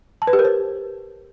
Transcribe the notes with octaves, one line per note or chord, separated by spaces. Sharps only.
A5
B4
G4
A#4
C5